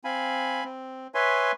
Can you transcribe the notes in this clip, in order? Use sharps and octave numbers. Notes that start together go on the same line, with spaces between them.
C4 F5 G#5 B5
C4
B4 C#5 E5 G#5 C6